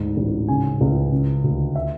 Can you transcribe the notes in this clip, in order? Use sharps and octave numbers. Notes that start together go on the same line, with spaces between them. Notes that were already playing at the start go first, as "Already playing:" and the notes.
Already playing: D2 G#2
A1
C#3 G#5
C#2
C#3
D2
E5